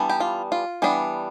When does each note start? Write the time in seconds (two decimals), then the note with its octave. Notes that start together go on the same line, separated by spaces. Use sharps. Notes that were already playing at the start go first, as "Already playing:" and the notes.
Already playing: E3 G3 B3 D4
0.10 G4
0.20 F4
0.52 F4
0.82 E3 G3 B3 D4